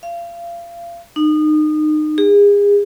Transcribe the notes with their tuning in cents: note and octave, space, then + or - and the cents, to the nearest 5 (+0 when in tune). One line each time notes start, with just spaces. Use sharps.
F5 -30
D#4 -30
G#4 -35